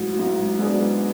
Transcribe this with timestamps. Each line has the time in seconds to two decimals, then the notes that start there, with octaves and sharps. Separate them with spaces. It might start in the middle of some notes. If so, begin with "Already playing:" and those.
Already playing: A1 G#2 F#3
0.17 A1 G#2 F#3
0.59 G#2 F#3 B3 D4 G#4